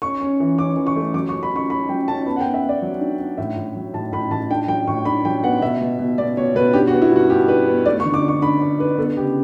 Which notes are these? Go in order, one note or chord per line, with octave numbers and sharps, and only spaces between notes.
C#4 C#6
C#4
E3
C#4 D6
E3
C#6
A3
F#3 D6
C#6
C#4
B5
C#4 C#6
C#4 B5
F#3 G5
C#4 A5
B3 B5
F#5
G5
B3
E5
B3 D5
F#3
D4
D4
A2 E5
A2
F#3
A2 A5
A2 B5
A2 A5
D4 G5
F#3 G5
A2 C#6
D4 B5
F#3 G5
B3 F#5
B2 E5
B2
B2
B2 D5
B2 C#5
B2 B4
D4 G4
F#4
B3
E4
G2 F#4
G2 G4
D4 B4
B3
A3 D5
C#6
D3
D6
D4
C#6
D4 B5
D4
D4 B4
B3 A4
C#3 G4